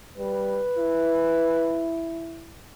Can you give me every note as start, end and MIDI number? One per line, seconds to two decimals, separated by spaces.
0.18 0.61 55
0.18 1.91 71
0.79 2.56 64